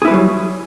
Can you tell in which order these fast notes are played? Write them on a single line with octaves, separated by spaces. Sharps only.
G#4 E4 B4 G3 F#3